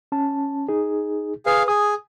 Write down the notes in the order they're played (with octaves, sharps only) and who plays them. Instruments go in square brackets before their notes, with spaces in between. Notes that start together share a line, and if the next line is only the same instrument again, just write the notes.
[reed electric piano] C#4 A5
D#4 G#4
[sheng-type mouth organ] G#4 F5 [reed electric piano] B4
[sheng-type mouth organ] G#4 [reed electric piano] D#6